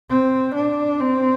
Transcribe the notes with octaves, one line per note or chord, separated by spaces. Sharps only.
C4
D4
C4